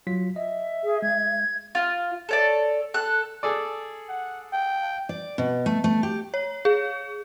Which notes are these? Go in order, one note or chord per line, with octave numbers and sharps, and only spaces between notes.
F#3 F4 B6
D#5 E5
G#4
G#3 G#6
F4
A4 C#5 D5
A4 F#6
G#4 A4 D5
F#5
G5
D5
B2
A3
A3
G4
C#5
G#4